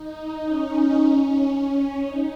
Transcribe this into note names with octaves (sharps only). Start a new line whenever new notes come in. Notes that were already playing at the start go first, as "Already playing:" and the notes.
Already playing: D#4
C#4
D#4